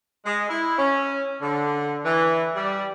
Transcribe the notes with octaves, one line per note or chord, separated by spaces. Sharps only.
G#3
E4
C#4
D3
E3
G3